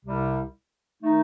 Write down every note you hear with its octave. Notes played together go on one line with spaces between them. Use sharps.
C2 C3 G3
D#3 A3 D#4